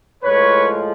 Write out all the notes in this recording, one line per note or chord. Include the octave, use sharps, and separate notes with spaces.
A2 F3 G#3 B4 C#5